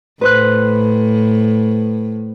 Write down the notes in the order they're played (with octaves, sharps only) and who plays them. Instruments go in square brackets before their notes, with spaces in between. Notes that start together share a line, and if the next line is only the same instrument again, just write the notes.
[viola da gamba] A2 [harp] B4 C5 F#6